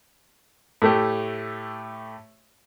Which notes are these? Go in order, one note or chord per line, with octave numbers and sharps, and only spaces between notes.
A2 A3 G4